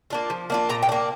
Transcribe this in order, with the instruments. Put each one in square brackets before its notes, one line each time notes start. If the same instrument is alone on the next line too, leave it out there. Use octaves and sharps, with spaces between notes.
[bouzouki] A#3 D4 F4
F3
A#3 D4 F4
A#2 A#5
G5
A#3 D4